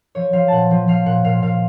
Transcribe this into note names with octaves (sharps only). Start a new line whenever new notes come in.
F3 C#5
F3 F5
A#2 F#5 A5
F3
F3 F5
A#2 F#5
A#2 F5
A#2 F5